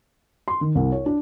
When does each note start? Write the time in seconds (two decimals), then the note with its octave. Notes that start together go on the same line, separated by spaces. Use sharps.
0.48 C6
0.61 D#3
0.75 C2
0.92 C#5
1.06 D4